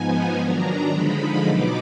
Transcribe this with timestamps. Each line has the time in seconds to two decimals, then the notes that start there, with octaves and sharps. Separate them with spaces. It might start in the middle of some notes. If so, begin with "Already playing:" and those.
Already playing: G#2 F3 B3 D#4 G#5
0.37 D#3 F#3 D4 A#5
0.90 D3 F3 G#3 D#4 B5
1.42 B2 F#3 B3 D#4 D6